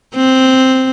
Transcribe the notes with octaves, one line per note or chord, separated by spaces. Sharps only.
C4